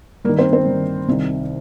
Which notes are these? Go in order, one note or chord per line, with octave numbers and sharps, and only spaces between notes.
G2 D#3 A#3 A#4
C4 C5
C4 C5
G2 D#3
C2 C3 D#3